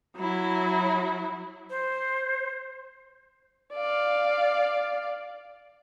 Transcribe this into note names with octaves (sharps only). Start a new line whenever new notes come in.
F#3 E4
C5
D5 F5